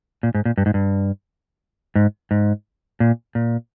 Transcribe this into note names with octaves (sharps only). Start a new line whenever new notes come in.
A#2
G#2
A#2
G2
G#2
G2
G#2
G#2
A#2
A#2